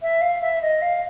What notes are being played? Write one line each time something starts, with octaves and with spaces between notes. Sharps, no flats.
E5
F5
E5
D#5
F5